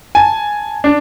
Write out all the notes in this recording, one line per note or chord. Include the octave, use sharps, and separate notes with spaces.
G#5 A5
D4